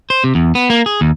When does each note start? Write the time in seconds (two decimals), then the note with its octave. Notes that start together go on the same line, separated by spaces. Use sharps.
0.10 C5
0.24 C3
0.35 E2
0.55 B3
0.70 A#3
0.86 G#4
1.01 D#2